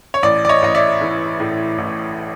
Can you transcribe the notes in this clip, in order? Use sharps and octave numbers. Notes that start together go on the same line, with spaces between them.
C#5
A1 D5
D5
C#5 D#5
A1 D#5
D5 E5
E3
A2
A1